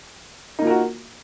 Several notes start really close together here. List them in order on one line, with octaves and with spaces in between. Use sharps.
D#4 A#3 F4 A#4 F#4